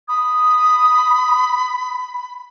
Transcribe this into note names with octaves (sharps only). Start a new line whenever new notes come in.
B5 D#6